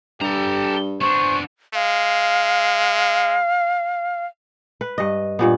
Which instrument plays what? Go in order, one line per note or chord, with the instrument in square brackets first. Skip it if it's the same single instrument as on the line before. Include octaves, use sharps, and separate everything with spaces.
[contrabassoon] G2 [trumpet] G4 [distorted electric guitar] A4 A#5
[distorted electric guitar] B3 D4 [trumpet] C5 [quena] C#6
[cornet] G#3 [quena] F5
[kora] B4
G2 D#5
G2 A#2 B3